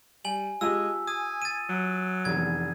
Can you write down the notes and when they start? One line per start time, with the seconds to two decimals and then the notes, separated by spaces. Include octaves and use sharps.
0.25 G3 G#5 F#7
0.61 G#3 F4 G4 A5 E6
1.08 G#5 D#6
1.42 A6 D#7
1.69 F#3
2.25 F1 E2 G#6